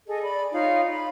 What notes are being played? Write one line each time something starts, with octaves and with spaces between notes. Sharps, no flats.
G#4 A4 D#5
D5 B5
D#4 F4 C#5 F5
B5